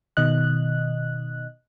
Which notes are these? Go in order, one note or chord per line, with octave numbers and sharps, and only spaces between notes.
B2 D#3 D#5 F#6